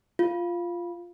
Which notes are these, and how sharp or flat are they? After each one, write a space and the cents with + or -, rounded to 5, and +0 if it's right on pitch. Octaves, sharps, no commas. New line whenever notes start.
F4 -5